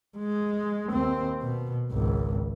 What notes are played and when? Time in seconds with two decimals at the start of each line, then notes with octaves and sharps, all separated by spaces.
0.17 G#3
0.91 D#2 C4
1.42 B2
1.91 G#1 C#2